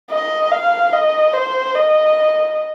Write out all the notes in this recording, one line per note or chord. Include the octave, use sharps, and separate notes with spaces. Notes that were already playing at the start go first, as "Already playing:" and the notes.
D#5
F5
D#5
C5
D#5